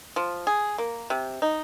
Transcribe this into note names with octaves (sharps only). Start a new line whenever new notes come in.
F3
G#4
A#3
C3
D#4